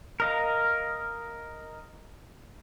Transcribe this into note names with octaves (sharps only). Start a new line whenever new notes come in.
A#4 D#5 F5